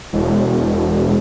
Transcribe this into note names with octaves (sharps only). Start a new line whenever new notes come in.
E1